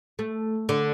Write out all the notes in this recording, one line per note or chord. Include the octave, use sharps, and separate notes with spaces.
A3
D3